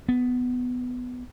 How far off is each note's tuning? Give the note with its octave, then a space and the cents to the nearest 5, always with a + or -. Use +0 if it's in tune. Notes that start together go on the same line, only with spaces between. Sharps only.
B3 +10